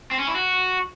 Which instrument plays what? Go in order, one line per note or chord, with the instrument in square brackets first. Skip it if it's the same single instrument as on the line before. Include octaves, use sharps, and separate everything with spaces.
[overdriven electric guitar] C4
C#4
E4
F#4